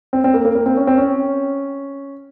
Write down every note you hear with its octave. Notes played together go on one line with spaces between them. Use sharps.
C4
C4
A#3
A#3
A#3
C4
C#4
C4
C#4